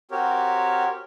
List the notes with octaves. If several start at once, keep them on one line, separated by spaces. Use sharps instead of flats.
C4 F#4 G4 A#4 C#5